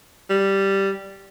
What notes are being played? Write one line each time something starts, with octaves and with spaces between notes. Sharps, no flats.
G3